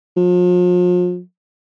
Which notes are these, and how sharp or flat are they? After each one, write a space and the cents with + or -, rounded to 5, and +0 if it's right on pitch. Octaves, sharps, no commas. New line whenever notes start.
F3 +40